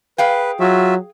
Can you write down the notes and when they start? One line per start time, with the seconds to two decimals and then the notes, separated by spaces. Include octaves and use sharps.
0.18 G#4 B4 F5 G5
0.60 F#3 F4 F#4 E5